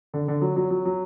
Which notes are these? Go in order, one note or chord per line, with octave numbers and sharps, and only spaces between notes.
D3
D3
F#3
F#3
F#3
F#3